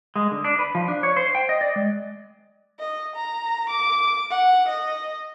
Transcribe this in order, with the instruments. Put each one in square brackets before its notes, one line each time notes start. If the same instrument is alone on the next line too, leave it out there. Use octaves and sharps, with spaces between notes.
[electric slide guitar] G#3
D3
D4
B4
F3
D4
C#5
C5
G5
D#5
D5
G#3
[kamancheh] D#5
A#5
D6
F#5
D#5